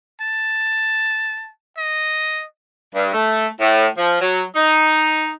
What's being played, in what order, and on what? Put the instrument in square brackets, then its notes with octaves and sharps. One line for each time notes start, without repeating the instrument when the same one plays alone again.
[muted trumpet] A5
D#5
[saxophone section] G2
A3
A2
F3
F#3
D#4